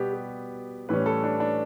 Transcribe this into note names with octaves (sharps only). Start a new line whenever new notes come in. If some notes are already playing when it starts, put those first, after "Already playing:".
Already playing: B2 G3 B3 G4
G4
A2 E3 G3 C#4 B4
A4
D4
D4